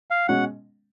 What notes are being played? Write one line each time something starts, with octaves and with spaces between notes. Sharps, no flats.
F5
B2 G#3 C#4 F#5